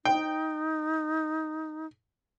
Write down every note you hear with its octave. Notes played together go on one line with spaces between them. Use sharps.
D#4 G5